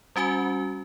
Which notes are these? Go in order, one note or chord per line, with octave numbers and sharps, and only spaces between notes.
G3 C#4 F#4 G#5